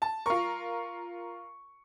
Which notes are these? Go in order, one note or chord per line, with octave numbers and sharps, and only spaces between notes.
A5
F4 A#4 C#6